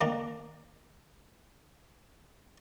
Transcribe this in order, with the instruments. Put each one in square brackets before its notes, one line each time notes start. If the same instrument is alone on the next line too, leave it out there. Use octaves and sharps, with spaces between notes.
[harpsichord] D#3 A#3 D4